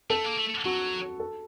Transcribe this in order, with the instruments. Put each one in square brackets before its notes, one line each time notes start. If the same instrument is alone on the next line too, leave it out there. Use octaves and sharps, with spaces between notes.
[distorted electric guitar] A3 [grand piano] A4
[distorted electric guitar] A#3
A3
[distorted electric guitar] F#3 [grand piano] F#4
[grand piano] A4